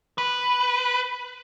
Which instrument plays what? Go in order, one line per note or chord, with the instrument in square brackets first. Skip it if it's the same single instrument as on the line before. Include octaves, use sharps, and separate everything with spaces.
[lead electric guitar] B4